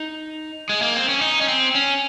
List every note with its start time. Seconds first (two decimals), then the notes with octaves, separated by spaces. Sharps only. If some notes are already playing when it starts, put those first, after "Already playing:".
Already playing: D#4
0.69 G#3
0.82 A#3
0.96 C4
1.09 C#4
1.21 D#4
1.41 C#4
1.48 C4
1.75 C#4